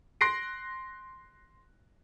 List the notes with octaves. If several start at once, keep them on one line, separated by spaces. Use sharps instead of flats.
C6 F#6 A#6 C7 D7